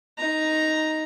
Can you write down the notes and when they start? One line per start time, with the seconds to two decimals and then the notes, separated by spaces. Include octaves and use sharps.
0.18 D#4 A#5